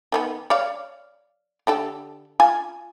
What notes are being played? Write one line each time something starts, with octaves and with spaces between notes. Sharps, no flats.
D#3 F3 B3
C#5 D5 F5
D3 G4 A4
F4 G#5